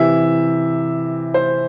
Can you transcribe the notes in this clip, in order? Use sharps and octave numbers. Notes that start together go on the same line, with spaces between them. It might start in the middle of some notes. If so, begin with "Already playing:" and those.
Already playing: C3 E3 E5
C5